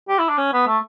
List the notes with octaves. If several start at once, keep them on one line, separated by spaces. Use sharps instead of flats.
G4
E4
D4
C#4
B3
A3